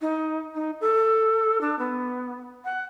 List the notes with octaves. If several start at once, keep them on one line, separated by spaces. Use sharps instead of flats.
D#4
D#4
A4
D4
B3
F#5